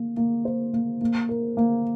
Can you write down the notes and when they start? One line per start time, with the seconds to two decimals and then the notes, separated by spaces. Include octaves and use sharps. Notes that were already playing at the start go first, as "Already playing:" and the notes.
Already playing: A#3
0.17 A#3
0.45 C5
0.73 A#3
1.01 A#3
1.29 A#4
1.57 A#3